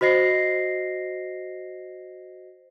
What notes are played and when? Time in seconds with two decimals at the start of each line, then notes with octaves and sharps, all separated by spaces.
0.01 F#4 C5 D#5 A#6 C7